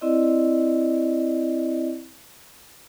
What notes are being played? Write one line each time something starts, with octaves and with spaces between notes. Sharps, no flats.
C4 E4 D5 D#5